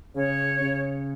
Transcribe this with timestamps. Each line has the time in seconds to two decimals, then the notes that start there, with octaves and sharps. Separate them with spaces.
0.15 C#3 C#5
0.61 C#3